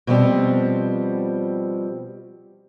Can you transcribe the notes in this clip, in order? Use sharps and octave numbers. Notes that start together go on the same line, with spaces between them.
B2 F3 G3 C4